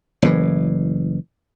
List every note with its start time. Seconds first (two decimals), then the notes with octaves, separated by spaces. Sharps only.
0.22 F#1 A2 E3